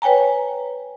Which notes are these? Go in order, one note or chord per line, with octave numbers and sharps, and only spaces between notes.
B4 C#5 G5 G#5 A#5